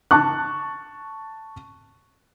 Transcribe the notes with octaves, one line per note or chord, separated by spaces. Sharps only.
A5 C#6 F#6